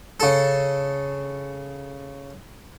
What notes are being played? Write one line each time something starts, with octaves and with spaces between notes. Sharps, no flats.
C#3 A4